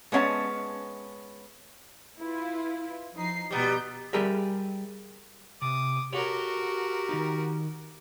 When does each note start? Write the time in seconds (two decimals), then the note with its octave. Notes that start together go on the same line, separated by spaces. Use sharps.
0.12 G#3 B3 C#4 E5 A5
2.22 E4 F4 B4
3.14 F3 D#4 C7
3.51 B2 G3 B3 A#5 G6
4.13 G3 G4 G#4 A#4 E5
5.62 C3 D6 D#6
6.13 F#4 G4 A4 A#4 C#5
7.09 D#3 D#4